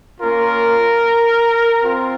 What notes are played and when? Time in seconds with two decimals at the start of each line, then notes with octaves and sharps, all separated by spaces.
0.20 A#3 C#4 F4 A#4
1.83 C4 F4